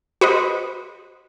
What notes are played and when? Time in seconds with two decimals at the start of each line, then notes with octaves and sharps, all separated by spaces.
0.21 F#4 B4 C5 D#5